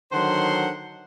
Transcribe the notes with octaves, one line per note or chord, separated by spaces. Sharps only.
D3 D#3 F#3 C5 F#5 C6